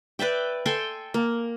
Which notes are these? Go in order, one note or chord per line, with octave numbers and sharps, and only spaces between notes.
B4 D5 E5 G5
A4 G5 G#5 C6
A#3